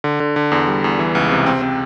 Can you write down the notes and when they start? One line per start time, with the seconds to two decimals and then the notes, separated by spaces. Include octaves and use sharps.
0.04 D3
0.20 D3
0.36 D3
0.52 E2
0.68 G3
0.84 E2
0.99 E3
1.15 C#2
1.31 C3
1.46 C4
1.62 C4